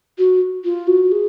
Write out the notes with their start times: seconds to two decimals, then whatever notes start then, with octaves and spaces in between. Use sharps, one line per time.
0.18 F#4
0.64 F4
0.87 F#4
1.12 G#4